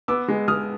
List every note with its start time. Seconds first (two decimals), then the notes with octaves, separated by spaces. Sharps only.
0.08 B3 D6 E6
0.28 G#3
0.48 G#3 D#6 F6